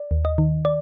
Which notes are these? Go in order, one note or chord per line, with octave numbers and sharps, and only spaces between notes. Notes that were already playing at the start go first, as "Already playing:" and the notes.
Already playing: D5
D#2
D#5
D#3
D5